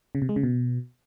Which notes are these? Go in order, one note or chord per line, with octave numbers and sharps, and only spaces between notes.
C#3
C3
G#3
C#3
B2